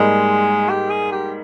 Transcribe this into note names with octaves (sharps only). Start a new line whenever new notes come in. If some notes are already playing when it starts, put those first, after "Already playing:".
Already playing: G#2 G3 G#3 A#3 D#4
G4
G#4
G4